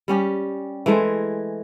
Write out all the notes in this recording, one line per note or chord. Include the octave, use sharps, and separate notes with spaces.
G3 C#4 G4
E3 G#3 A3 C5